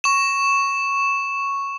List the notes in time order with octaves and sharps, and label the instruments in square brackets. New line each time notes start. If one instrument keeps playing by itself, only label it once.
[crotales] C#6 E7